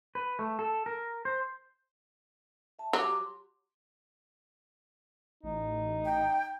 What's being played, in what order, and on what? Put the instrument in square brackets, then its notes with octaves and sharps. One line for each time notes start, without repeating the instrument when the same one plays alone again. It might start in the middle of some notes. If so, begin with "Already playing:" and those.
[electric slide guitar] B4
A3
A4
A#4
C5
[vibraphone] E5 A5
[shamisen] F#3 [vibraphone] G4 D6
[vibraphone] C6
[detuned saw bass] A1 [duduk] D#4
[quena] G5